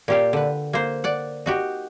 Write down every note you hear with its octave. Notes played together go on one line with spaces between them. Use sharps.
A#2 G4 F5
D3 B4
A#3 C5
D5 F#5
D#4 F#4 G4